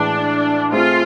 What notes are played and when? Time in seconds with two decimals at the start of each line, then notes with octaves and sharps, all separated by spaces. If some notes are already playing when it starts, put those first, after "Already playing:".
Already playing: A2 E3 G#3 D4
0.72 A3 C4 F4 G#4